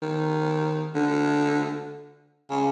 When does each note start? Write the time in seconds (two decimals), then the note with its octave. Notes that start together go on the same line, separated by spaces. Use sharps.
0.02 D#3
0.95 D3
2.51 C#3